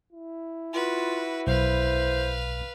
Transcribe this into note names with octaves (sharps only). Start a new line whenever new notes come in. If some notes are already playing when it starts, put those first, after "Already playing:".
E4
F4 F#4 B4
B1 B4 C5 F5